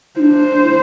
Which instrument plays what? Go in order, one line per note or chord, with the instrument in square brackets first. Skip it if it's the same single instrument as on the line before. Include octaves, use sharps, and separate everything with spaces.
[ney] E4
[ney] D4 [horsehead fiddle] C5
[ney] E4